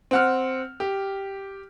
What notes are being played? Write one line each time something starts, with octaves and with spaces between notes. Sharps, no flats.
C4 F#5 F6
G4